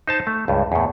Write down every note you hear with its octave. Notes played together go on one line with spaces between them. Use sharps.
D#4 C5 A5
A3
C#2 G2
E2 A2